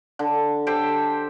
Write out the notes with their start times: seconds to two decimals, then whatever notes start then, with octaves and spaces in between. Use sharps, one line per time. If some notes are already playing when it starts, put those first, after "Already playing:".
0.19 D3
0.67 G4 A4 C5 G5